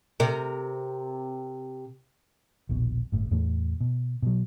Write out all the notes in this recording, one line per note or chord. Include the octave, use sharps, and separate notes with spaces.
C3 A#4
D#1 A#1 B2
G1 A2
E2 A2 E3 A3
B2
B2 F#3